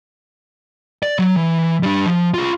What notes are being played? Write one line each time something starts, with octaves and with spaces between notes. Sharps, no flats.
D5
F#3
E3
G3 D4
F3
F4 G#4